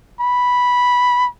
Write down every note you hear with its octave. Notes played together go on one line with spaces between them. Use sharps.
B5